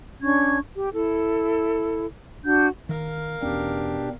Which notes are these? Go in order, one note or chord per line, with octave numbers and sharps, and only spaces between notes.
C#4 D4 C#6 G#6
G4
E4 A4
D4 F#4 F#5 G6
D#3 A#4 F5
E2 B2 C#4 D4 G4